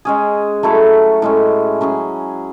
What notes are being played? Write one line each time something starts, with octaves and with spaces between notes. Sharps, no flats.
G#3 C#4 G#4
F#3 A3 E4 A4
A2 G#3 C#4
F#3 C#4 G#4